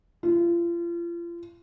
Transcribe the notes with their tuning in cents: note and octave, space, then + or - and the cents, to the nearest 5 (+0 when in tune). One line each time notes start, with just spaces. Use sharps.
F4 -35